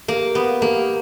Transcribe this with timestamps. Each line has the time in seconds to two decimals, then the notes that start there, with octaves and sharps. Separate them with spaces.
0.08 A#3 G4
0.35 B3 G4
0.61 A#3 G4